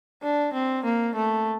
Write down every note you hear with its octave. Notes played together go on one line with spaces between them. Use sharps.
D4
C4
A#3
A3